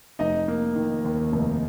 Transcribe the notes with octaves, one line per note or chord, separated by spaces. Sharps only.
F1 D#4 D#5
A#3
D#3
D#2
F1